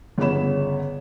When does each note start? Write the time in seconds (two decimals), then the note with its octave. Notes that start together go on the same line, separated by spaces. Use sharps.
0.18 G1 C#3 B3 C#5 B5 E7